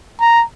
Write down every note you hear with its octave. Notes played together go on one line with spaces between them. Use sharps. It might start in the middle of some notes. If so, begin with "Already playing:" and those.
A#5